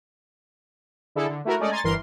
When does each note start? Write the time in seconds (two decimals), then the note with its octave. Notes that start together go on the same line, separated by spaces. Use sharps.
1.15 D3 E4 G#4 A4
1.29 D3
1.45 A3 E4 F#4 A#4
1.59 G#3 A3 C#4 D5 D#5
1.71 G#5 A#5 C6 C#6 A6
1.84 G1 E3 A#4 C6